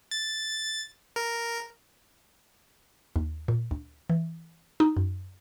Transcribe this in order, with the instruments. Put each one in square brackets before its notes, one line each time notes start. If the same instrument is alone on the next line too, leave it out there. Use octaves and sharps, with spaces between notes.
[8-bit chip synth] A6
A#4
[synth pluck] D#2
A#2
D2
E3
D#4
F#2